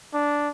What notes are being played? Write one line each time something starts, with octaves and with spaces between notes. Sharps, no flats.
D4